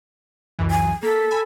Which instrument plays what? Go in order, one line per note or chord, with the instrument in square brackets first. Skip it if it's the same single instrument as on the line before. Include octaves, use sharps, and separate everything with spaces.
[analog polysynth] C#2 F#2 E3
[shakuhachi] G#5
[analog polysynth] A#3 B6 [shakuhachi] A4
[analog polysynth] G#5 B5 E6